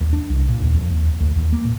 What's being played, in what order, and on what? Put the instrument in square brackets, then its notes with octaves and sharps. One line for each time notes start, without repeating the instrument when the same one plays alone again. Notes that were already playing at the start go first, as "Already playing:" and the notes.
[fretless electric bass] D#2
D4
C2
A#2
D#2
F2
D#2
D2
D#2
A#3
A#2